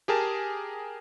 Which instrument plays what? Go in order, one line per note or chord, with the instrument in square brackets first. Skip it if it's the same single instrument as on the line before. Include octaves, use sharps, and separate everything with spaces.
[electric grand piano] G4 G#4 A#4 A5